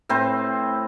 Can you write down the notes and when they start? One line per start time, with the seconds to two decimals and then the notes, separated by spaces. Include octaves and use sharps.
0.09 A2 C4 B4 C5